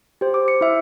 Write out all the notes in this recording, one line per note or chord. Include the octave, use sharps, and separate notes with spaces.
G4 C5
D6
C#7
E4 E5